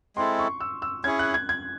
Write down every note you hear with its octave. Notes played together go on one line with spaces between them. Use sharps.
G#3 C4 E4 A4 C6
C#6
E6
E6
C#4 E4 G#4 C#5 G#6
F#6
G#6
G#6